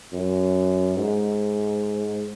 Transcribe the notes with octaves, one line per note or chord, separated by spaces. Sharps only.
F#2
G#2